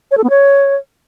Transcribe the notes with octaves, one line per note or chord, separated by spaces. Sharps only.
C#5
A4
B3
C#5